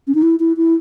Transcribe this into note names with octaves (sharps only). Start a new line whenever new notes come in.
C#4
D#4
E4
E4
E4